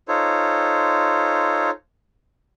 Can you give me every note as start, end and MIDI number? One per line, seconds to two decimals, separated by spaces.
0.08 1.70 63
0.08 1.70 65
0.08 1.70 69
0.08 1.70 72
0.08 1.70 73